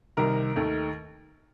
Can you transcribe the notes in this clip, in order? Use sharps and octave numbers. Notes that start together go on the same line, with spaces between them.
C2 C3 D#3 A#4 A#5
D#2 D#3 A3